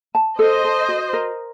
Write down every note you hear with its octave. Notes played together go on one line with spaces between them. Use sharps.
A5
A4 C5 D#5
A4
F#4
A#4